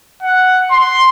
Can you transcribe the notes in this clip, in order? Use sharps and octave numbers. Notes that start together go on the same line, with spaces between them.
F#5
C6